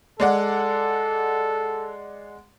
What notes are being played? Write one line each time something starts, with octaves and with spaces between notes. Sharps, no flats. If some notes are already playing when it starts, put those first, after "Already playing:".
G#3 A4 D5 F#5